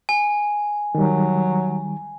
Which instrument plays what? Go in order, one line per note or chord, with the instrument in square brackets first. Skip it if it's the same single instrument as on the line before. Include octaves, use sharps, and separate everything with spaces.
[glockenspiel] G#5
[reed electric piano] D#3 G3 [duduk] F#3